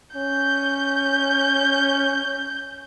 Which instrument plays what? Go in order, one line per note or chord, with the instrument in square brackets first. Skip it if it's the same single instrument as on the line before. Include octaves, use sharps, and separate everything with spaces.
[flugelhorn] C#4 [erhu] G6